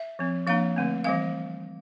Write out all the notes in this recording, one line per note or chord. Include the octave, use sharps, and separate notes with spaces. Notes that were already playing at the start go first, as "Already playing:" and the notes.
Already playing: E5
F3 C4
F3 A#3 D4 F5
D3 A3 C4
E3 G3 C4 F5